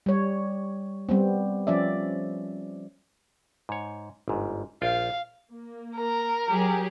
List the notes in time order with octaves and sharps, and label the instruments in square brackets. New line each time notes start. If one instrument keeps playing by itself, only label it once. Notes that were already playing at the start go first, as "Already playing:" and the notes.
[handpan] G3 C#5
G3 B3 C4
F3 C#4 D5 E5
[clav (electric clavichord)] G#2 C#5
G1 G#2
[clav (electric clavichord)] A#1 F4 G5 [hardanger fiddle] F5
[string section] A#3
[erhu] A#4
[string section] F#3 G4 G#4